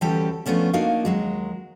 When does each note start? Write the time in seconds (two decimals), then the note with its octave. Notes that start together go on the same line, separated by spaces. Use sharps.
0.01 D2 E3 G3 C#4 G4 A4
0.46 F3 A3 B3 C#4 D4
0.73 A#3 D4 D#4 F#4 F5
1.05 D#2 F#3 G#3